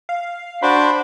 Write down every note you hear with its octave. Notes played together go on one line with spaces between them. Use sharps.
F5
D4 F#4 C5 B5